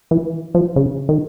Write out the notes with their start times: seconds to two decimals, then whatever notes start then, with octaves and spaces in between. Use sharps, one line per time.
0.11 E3
0.55 F3
0.76 C#3
1.09 D#3